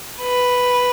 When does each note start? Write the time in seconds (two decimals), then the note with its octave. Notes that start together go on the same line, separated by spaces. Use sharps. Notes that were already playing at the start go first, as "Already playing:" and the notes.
0.22 B4